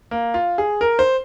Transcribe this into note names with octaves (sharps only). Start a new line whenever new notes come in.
A#3
F4
G#4
A#4
C5